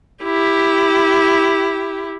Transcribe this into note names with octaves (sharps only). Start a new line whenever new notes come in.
E4 G4